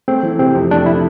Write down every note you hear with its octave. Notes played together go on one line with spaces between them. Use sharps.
A3 C4
E3
C3 C4
F2
A3 D4
E3 E4